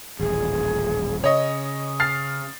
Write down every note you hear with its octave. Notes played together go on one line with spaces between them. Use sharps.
D#1 A1 G#4
C#3 C#5 D#5 D#6
F6 A6 C7